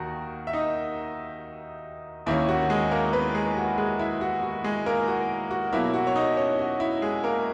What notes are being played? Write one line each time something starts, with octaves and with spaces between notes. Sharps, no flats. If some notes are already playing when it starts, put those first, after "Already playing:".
Already playing: D#2 D#3 F#4 A#4
E5
D#4 D#5
D#2 D#3 A#3 C#4 E4
F#4
G#3 G#4
A#3 A#4
B3 B4
G#3 G#4
F#4
G#3 G#4
E4
F#4
F#4
G#3 G#4
A#3 A#4
F#4
F#4
B2 F#3 A#3 E4
F#4
C#5
D#4 D#5
C#4 C#5
F#4
E4
G#3 G#4
A#3 A#4